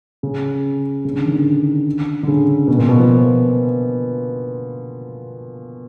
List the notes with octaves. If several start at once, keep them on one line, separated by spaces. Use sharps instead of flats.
C#3
C#3
D3
D#3
D3
D3
C#3
B2
A#2
B2
F3